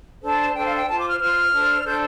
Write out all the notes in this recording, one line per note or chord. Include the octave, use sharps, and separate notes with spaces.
D4 A4 C5 A5
D4 A4 C5 G5
F5
G5
F4 C5 A5
D6
F6
F4 C5 F6
D4 A4 C5
D4 A4 C5 G6